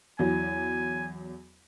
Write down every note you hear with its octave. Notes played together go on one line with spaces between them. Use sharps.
E2 F#3 G#5